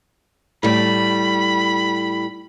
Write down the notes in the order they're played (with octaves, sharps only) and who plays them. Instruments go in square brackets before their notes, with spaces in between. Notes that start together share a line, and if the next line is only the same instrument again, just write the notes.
[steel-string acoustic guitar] A2 G3 [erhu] B5